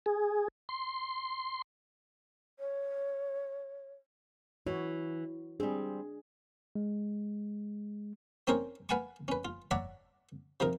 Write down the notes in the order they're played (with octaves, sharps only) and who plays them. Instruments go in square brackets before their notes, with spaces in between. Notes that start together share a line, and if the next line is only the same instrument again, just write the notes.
[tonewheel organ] G#4
C6
[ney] C#5
[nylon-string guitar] E3 [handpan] F#4 C#5
[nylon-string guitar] G3 C4 [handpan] D4 G#4
[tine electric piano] G#3
[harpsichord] C4 C#4 D#4 A#4 C5 C#5
B4 F5 F#5 G#5 A5 C#6
C#4 B4
F4
C#5 D5 E5 F#5 A5 A#5
C3 F3 D#4 A#4